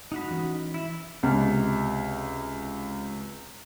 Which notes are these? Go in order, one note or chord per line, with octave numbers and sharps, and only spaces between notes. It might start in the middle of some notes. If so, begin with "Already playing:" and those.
D#4 F#4 B5
E3 C#4
E4
C#2 C3